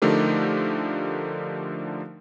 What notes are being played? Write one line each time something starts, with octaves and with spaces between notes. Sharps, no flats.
D3 F3 A3 D#4 G4 A#4